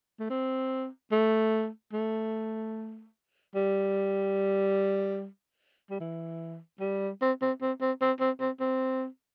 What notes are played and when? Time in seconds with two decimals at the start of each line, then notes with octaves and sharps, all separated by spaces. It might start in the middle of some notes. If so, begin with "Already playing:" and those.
0.20 A3
0.30 C4
1.12 A3
1.93 A3
3.55 G3
5.90 G3
6.00 E3
6.81 G3
7.22 C4
7.42 C4
7.62 C4
7.82 C4
8.02 C4
8.20 C4
8.40 C4
8.60 C4